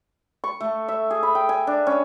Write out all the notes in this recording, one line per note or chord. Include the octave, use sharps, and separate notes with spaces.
C#6
A3
E5
G#4
B5
G5
G#5
D4
C#4